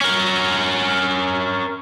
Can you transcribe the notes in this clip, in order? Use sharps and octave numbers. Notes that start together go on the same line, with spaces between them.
C#4 A#4